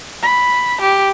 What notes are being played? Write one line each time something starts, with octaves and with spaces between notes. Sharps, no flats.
B5
G4